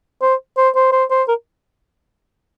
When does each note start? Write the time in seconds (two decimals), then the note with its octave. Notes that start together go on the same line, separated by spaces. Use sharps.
0.22 C5
0.57 C5
0.75 C5
0.92 C5
1.11 C5
1.28 A#4